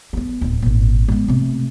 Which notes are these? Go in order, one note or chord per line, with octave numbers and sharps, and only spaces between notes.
A#3 B3
D1 D#2
G#1 A#2
G#3 B3
C3 A3